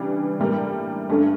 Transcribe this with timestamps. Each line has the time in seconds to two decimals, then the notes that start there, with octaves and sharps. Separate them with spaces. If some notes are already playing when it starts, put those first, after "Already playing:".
Already playing: C#3 E3 G3 D4
0.40 A2 G3 A#3
1.09 G2 D3 A3 C#4